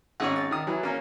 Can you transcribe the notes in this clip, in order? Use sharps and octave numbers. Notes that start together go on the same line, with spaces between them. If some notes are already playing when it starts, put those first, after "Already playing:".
G#1 C#4 G#4 C#5 F#5
A6
D#3 D#6
E3 F#3
A#3 C#4